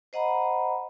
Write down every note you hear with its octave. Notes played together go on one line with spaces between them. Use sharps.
C5 D#5 F#5 A#5 B5